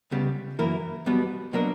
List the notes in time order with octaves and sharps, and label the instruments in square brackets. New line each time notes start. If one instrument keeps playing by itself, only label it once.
[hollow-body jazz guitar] C#2 C#3 G3 B3
F#2 E3 A#3 E4 A#4
B1 B2 G3 B3
B2 F#3 A#3 D4 A#4